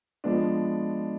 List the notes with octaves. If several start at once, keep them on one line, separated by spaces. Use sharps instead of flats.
F3 G#3 B3 D4